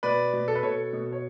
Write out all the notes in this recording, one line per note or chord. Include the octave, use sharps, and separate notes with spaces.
B2 B4 D5
B2
A4
B4
B2 A4 C#5
B2
C#5